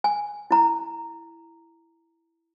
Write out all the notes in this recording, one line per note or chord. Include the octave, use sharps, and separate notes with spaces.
G#5
E4 A#5